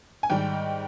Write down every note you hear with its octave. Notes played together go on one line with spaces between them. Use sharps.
G#5
G#2 D#3 G3 G5